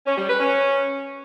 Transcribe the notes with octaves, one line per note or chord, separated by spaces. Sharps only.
C#4
G3
B4
C#4